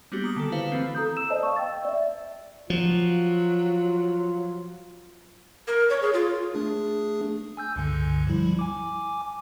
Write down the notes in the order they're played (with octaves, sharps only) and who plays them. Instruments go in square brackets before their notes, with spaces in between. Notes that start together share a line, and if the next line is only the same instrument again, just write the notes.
[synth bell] G3 A#3 B3 D4 F#4 G4
A#5 D6 D#6
D3 D#3 A4
E4 F#4 B4 C5 F5
E3 A3 C4
[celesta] A4 A#5 D#6 G6
E6 E7
C5 D5 D#5 A5
F5 C#6
G5 E6 A6
D5 E5
[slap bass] F3 [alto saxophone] F#3 [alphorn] F4
[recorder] A#4
C#5
G#4
F4
[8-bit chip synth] A3 D4 G#4
G#5 E6 G6
C#2 G2 D3
F3 G3 E4
G#5 D6